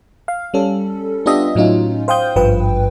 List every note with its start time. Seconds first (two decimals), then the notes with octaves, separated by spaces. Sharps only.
0.28 F5
0.54 G3 C#4 A4
1.26 B3 D4 F4 G4 D#5 E5
1.55 A2 F#3 C#4 D#4 F4
2.08 C5 F5 G5 D#6 G6
2.36 G#1 G2 F3 B4 G5